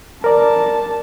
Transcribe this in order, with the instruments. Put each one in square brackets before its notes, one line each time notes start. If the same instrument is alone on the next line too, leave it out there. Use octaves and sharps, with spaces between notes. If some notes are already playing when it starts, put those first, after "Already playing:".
[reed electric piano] A#4 D5 [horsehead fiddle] A5